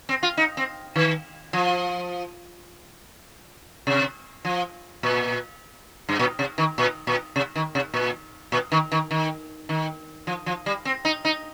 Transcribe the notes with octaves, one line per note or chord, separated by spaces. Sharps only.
C4
F4
D#4
C4
D#3
F3
C3
F3
A#2
G2
A#2
C3
D#3
A#2
A#2
C3
D#3
C3
A#2
A#2
D#3
D#3
D#3
D#3
F3
F3
G3
C4
D#4
D#4